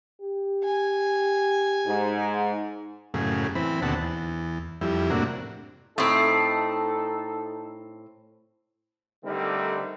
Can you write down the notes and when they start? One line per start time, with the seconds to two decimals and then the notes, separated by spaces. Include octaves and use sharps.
0.21 G4
0.65 G#5
1.87 G#2
3.14 F#2 A2 C#3 G#4
3.55 E3 C4 B5
3.82 D#2 B2 D3 C4 F#5 A5
4.01 E2
4.81 F2 G3 E4
5.10 A2 C3 A#3 D4 F#4
5.98 A2 C4 D#4 A4
9.24 D3 D#3 G3 A3 C4 D#4